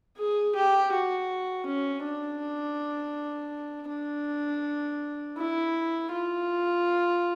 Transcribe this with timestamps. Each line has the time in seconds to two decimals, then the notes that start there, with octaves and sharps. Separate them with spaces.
0.18 G#4
0.55 G4
0.93 F#4
1.66 C#4
2.04 D4
3.89 D4
5.37 E4
6.11 F4